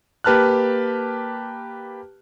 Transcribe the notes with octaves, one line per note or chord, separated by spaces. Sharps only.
A#3 G4 B4 A5 F6 F#6